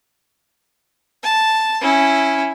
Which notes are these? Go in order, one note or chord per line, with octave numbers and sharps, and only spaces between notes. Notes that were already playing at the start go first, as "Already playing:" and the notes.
A5
C#4 E4